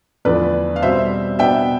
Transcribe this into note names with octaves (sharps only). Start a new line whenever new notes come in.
E2 D3 F3 A3 D4 B4 D5
F5
B2 G3 C4 C5 E5
B2 B3 D4 E5 G5